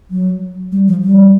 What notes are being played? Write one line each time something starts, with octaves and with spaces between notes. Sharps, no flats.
F#3
G3
F3
G3